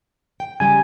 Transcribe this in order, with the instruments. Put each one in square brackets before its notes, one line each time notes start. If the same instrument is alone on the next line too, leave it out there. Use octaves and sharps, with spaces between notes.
[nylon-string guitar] G5
[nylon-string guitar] C#3 G3 G4 [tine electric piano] G#5